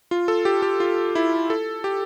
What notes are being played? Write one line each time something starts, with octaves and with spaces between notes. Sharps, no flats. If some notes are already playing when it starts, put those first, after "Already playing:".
F4
A4
G4
G4
F4
E4
A4
G4